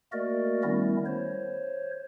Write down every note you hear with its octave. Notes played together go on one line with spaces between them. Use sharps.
A3 A#3 F#4 A#4 D5 D#5
D#3 G3 A3 B3 C#4 E4
C5 C#5